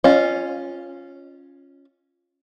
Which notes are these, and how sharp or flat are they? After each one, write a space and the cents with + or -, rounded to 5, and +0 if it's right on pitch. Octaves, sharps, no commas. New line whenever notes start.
C#4 -5 F4 +0 D#5 -30